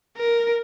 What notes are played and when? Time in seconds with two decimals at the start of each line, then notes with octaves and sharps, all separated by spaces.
0.17 A#4